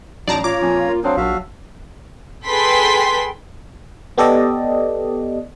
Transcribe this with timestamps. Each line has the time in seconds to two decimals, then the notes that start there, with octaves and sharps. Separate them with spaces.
0.28 A1 F#3 D#4 D5 A5 A#5
0.44 F4 C#5 A#5 D6
0.61 F2 A#2 G#5
0.87 A#3
1.04 F#3 C4 D4 F5 C6 D#6
1.17 A#1 F#3 F#4 E5 F5 A5
2.46 G#4 A4 B4 G5 C6 B6
4.18 B3 G4 A4 D5 D#5